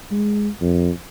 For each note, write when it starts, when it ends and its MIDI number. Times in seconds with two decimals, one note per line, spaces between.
0.11 0.48 56
0.61 0.90 41